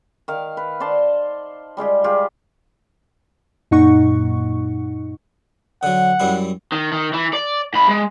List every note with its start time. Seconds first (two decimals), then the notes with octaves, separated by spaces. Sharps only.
0.28 D#3 F5
0.57 B4
0.80 C5 D5 A5 C6
1.77 G3 G#3 F4 G4
2.04 G3 F4 G4 G#4
3.71 F#2 A#2 D#4 F#5 C#6
5.83 D3 F#3 F#5
6.20 F#2 G3 E4
6.72 D#3
6.92 D#3
7.14 E3
7.33 D5
7.74 G#2 B5
7.89 G#3